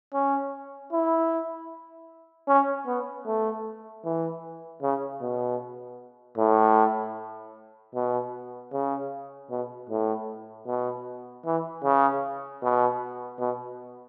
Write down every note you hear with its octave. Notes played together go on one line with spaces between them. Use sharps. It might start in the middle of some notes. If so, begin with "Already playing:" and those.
C#4
E4
C#4
B3
A3
E3
C#3
B2
A2
B2
C#3
B2
A2
B2
E3
C#3
B2
B2